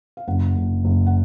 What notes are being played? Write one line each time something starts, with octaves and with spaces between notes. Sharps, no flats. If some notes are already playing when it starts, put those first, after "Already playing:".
F5
F#1 F#5
F#1
F#1
F#5